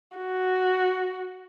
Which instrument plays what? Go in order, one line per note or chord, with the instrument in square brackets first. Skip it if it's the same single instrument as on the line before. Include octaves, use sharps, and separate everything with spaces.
[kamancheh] F#4